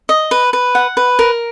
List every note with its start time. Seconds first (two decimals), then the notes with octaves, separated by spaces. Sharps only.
0.09 D#5
0.31 B4
0.53 B4
0.75 F#5
0.97 B4
1.19 A#4